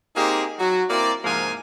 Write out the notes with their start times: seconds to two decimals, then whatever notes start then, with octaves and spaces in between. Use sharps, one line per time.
0.16 A#3 C4 D#4 G4 G#4
0.59 F#3 F#4
0.90 A#3 C4 E4 A#4 D5
1.24 G#2 C3 F3 A#3 F4 G#5